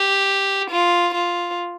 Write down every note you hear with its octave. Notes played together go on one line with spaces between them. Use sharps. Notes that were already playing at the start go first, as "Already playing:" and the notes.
Already playing: G4
F4
F4